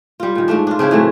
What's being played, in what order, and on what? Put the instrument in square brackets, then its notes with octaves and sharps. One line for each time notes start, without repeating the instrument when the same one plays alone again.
[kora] G3 F4
A#2 D#3
G#2 F3 A3 D4
D4 F4
C#3 C4 D4 E4
A2 E3 F#3 A3